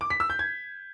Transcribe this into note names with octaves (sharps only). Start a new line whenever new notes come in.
D6
B6
E6
G6
G#6